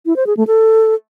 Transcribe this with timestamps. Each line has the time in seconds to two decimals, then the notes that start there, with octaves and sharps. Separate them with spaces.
0.06 E4
0.16 C5
0.27 G#4
0.37 A3
0.47 A4